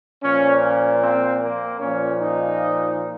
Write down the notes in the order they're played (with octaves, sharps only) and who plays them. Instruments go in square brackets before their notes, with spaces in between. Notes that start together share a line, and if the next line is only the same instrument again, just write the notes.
[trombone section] A#2 F3 C#4
C4
A#3
A#2 F3 C#4
D#4